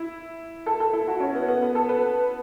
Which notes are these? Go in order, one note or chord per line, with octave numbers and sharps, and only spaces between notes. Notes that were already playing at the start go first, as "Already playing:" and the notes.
Already playing: E4
A4
A4
E4
F#4
C#4
B3
B3
B3
A4
B4